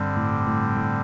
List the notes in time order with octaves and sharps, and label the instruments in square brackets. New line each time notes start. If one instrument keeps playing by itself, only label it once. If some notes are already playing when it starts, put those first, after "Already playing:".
Already playing: [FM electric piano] G2 [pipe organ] D3 G3 C4
[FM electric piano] A2
A2
A2